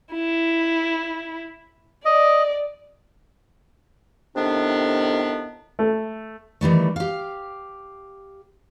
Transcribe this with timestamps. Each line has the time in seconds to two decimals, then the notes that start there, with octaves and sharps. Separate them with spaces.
0.12 E4
2.05 D5 D#5
4.35 A2 C3 D#3 B3 D4
5.79 A3
6.61 D#3 E3 G3 A3
6.96 G4 F5